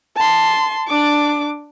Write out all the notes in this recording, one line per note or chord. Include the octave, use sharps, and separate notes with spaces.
A5 C6
D4 D6